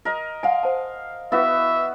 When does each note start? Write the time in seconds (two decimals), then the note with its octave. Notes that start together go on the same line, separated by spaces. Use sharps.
0.05 A#4 D#5
0.43 F5 F#5 G#5 C6
0.63 C5 A5
1.32 B3 E4 F#4 B4 E5 F5